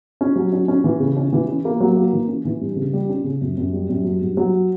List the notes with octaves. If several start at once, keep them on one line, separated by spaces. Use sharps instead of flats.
C#4
F#3
C#4
C#4
E3
C#3
C#4
E3
C#4
A#3
F#3
A#3
E3
C#4
E3
G2
C#3
G3
C#4
C#3
F#2
F#2
G3
F#2
F#3
G2
F#3